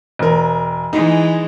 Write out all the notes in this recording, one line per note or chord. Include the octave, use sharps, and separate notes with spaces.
E1 A#4
E3 G#3 D#4